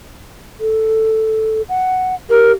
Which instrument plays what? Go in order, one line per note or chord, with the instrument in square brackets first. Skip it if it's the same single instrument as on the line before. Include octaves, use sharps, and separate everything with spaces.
[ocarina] A4
F#5
[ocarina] G4 [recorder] A#4